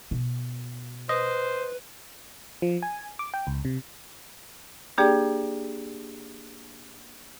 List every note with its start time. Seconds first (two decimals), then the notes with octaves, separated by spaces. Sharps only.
0.11 B2
1.09 B4 C5 D#5
2.62 F3
2.82 G#5
3.19 D6
3.34 G5
3.47 C#2
3.65 C3
4.98 A#3 D4 G4 G#4 D5 G5